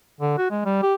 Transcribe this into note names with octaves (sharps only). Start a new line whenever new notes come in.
D3
F#4
G#3
G3
G4